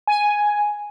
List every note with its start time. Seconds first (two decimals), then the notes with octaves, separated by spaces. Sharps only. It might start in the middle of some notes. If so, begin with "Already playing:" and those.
0.07 G#5